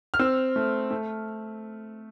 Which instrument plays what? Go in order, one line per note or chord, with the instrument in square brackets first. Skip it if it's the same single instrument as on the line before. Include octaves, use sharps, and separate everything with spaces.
[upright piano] F6
C4 E6
A3
A3